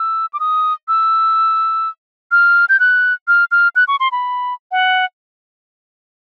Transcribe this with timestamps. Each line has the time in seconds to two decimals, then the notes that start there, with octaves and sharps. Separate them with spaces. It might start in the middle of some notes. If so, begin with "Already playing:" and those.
Already playing: E6
0.33 D6
0.40 D#6
0.88 E6
2.32 F6
2.69 G6
2.80 F#6
3.28 F6
3.51 F6
3.76 F#6
3.88 C#6
4.00 C6
4.12 B5
4.72 F#5